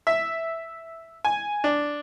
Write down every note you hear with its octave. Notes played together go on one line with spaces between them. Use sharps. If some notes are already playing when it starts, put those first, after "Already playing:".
E5
G#5
D4